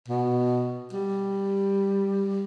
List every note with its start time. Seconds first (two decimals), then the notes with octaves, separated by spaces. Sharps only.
0.08 B2
0.93 G3